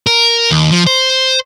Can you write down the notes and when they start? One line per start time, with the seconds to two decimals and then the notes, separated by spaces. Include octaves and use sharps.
0.07 A#4
0.51 D#2
0.71 F3
0.87 C5